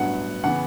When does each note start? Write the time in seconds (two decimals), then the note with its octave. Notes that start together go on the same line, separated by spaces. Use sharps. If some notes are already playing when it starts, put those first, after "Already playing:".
Already playing: A1 G2 F#3 B3 F#5
0.44 C#3 E3 B3 F#5